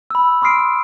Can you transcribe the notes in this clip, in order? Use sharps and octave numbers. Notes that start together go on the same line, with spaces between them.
B5 E6
B5 C6 D#6 F6 C7 D7